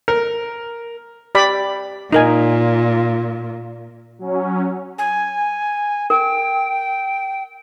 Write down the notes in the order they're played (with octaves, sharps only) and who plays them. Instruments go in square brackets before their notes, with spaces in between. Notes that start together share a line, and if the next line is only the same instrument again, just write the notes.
[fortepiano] A#4
[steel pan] G4 D5 B5
[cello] A#2 [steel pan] D#4 A#4 G#5
[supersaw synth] F#3 C#4
[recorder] G#5
[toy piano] A#4 [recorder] G5